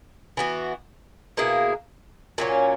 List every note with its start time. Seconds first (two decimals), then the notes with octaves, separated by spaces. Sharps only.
0.37 E3 B3 F#4
1.37 B2 A#3 E4 G#4
2.38 A#2 F#3 C#4